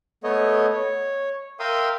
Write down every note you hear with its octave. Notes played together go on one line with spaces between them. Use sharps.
A3 B3 C#5 D#5
C#5
A#4 E5 F5 G5 C6 D#6